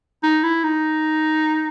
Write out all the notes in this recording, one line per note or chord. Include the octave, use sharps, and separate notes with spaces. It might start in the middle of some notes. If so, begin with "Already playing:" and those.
D#4
E4
D#4